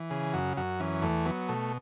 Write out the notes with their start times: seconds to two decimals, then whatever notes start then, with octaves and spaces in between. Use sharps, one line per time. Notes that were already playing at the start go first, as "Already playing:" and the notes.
Already playing: E3
0.10 C#3 G#4
0.33 F#2 F#4
0.57 F#2 F#4
0.80 E3 C#4
1.02 E2 A3
1.25 F#3 B3
1.49 B2 A3